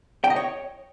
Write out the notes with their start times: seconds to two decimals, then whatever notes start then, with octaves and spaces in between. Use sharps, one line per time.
0.24 G5
0.30 D#5
0.36 C#5